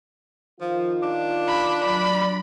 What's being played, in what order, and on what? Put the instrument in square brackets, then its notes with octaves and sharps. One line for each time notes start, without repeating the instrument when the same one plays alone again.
[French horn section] D#3 F4 [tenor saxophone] F3
[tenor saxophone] D4
[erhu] B5
[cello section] F#3 D5 [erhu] B5